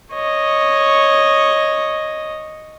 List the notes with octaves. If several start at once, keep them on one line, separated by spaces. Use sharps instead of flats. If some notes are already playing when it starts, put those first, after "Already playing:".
C#5 D#5